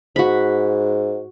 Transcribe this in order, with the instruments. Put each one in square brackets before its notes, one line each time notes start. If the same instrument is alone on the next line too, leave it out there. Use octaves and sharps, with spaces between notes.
[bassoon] G#2 [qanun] F#4 B5